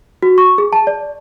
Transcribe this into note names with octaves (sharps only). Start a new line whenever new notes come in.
F#4
C#6
G#4
A5
D5